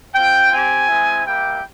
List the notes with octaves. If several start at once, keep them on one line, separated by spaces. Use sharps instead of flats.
C4 F4 G5
C4 G4 G#5
G#3 C4 E4
G3 A#3 E4 G4 G5